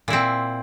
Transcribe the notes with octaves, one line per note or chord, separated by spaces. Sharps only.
A#2 C4 E4